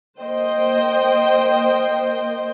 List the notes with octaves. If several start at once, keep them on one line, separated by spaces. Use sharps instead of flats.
A#3 C5 D#5 G5